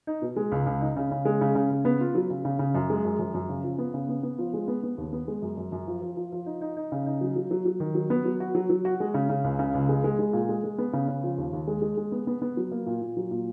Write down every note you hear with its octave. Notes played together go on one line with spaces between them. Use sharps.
D#4
B2
G#3
C#2
C#2
D#4
C#3
C#3
G#3
C#3
C#3
C#3
B3
F4
F#3
C#3
C#3
C#3
F#2
G#3
F#2
F#2
F#2
C#3
F3
B3
C#3
B3
B3
F3
G#3
B3
B3
D#2
B3
G#3
F#2
F#2
F#2
F3
F3
F3
F3
D#4
D#4
D#4
C#3
D#4
F#3
F#3
F#3
F#3
D#3
F#3
B3
F#3
F#4
F#3
F#3
F#4
G#3
C#3
C#3
C#2
C#3
C#2
G#3
G#3
G#3
A#2
G#3
G#3
B3
C#3
C#3
F3
D#2
D#2
G#3
G#3
G#3
B3
B3
B3
F#3
A#3
A#2
A#2
F#3
A#2